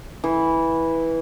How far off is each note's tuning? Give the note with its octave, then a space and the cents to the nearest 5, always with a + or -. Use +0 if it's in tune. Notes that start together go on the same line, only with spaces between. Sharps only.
E3 -10